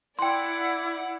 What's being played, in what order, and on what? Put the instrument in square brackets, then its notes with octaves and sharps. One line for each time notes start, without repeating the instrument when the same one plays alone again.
[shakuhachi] E4 [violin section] D5 F#5 D6 [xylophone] G5 C6